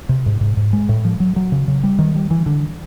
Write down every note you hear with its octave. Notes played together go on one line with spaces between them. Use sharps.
C3
G#2
G#2
G#2
G#3
A2
F3
F#3
F#3
C#3
C#3
G3
D#3
G3
E3
D3